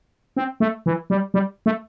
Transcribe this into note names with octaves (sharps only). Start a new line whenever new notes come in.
C4
A3
E3
G3
G3
A3